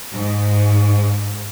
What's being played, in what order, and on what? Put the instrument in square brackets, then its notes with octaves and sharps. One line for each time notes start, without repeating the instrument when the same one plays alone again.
[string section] G#2